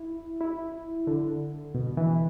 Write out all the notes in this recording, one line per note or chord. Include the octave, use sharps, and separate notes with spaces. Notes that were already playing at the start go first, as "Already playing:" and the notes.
Already playing: E4
E4
D3
B2
E3